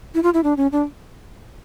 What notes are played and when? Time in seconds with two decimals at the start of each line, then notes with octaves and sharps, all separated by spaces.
0.15 E4
0.23 F4
0.34 E4
0.44 D4
0.57 C#4
0.72 D4